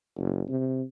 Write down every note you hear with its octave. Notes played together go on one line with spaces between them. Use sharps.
F#1
C3